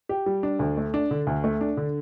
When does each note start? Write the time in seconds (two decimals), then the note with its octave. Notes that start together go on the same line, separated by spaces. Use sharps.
0.09 G4
0.26 G3
0.43 D4
0.59 D2
0.77 A3
0.94 D4
1.11 D3
1.27 D2
1.44 A3
1.61 D4
1.77 D3